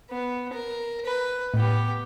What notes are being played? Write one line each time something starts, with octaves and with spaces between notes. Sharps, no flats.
B3
A#4
B4
A2 B3 G4